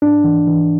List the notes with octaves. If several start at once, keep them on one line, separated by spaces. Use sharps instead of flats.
G#2 D4
E3
E3